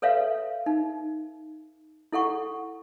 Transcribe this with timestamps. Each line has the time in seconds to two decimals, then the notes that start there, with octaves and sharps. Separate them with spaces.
0.02 A4 B4 C#5 E5 F5
0.66 D#4
2.12 E4 A4 F#5 C#6